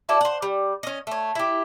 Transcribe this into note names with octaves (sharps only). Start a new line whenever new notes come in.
E4 F#4 A4 D5
C5 F#5
G3
C#4 D#5
A3 C#5
E4 G4